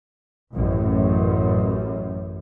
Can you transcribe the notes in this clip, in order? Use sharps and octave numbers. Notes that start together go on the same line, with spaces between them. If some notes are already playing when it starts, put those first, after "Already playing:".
A1 F#2